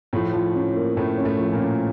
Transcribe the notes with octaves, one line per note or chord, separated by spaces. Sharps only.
A2 F3 A3
F3
C#4
A#3
A2 A3 C#4
C#4
A2 A3
F3
A#2 A#3
C#4